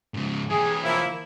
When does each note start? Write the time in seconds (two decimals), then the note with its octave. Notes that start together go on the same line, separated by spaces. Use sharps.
0.14 G#2 C#3
0.50 E3 G4 G#4
0.83 F3 A#3 E4